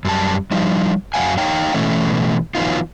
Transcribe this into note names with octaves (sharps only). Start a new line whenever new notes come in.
F#2 G3 A5
F3 G3 D#4
F#2 F#3 C4 F5 F#5 G#5
D#4 C#5 F5 G5 A#5
B2 E3 A3 C#4
E3 F#3 A3 B3 D#4 F4